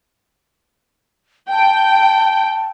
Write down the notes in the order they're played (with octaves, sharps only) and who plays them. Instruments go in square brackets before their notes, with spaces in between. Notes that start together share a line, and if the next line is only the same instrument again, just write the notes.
[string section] G5 [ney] A5